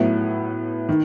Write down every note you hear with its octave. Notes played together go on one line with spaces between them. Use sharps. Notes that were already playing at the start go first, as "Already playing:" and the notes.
Already playing: A2 F#3 B3 E4
D#3